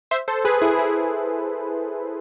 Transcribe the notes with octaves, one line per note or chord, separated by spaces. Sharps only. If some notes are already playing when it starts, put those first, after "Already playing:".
C5 E5
A4 C5
G#4 B4
E4 G#4
E4 G#4